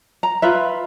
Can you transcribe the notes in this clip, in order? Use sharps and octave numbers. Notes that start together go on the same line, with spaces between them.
A#5
F4 B4 E5